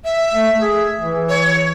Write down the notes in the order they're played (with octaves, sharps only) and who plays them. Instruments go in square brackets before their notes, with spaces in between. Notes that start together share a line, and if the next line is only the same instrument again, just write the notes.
[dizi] E5
[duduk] A3
G#4
E3
[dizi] C#5